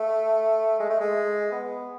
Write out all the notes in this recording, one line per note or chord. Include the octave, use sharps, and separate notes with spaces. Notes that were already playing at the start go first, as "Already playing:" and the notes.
Already playing: A3
G#3
A3
G#3
B3